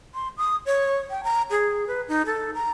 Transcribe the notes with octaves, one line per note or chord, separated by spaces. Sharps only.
C6
D#6
C#5
G5
A#5
G#4
B4
D#4
A4
A#5